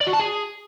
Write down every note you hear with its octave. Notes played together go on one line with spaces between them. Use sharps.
D5
F#4
A5
G#4